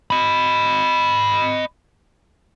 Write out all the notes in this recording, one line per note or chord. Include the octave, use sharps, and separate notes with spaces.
D#5 B5